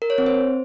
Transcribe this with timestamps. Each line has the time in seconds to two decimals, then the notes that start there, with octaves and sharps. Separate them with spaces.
0.02 A#4
0.10 C#5
0.18 C4
0.26 C5